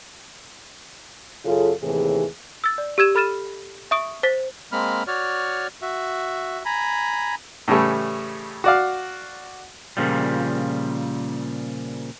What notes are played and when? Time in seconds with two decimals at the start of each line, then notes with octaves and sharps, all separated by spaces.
1.45 F#2 C#3 F4 G#4 A4
1.82 D#2 A2 C3 E3 G#4
2.64 E6 A6
2.78 D5
2.98 G4 E6 G#6 E7
3.15 A4 B5 F6 A6 D#7 E7
3.91 E5 C#6 D#6 D7
4.23 C5 A6 B6
4.72 G#3 A#3 C4 B5 F6
5.07 F#4 C#5 D5 F6
5.82 F#4 E5
6.65 G#5 A#5 B5
7.68 A2 C#3 E3 G3 A3
8.64 F#4 D5 F5
9.97 A#2 C#3 F3 G3